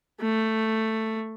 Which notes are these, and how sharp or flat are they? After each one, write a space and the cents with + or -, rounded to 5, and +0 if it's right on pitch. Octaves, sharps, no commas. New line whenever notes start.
A3 +10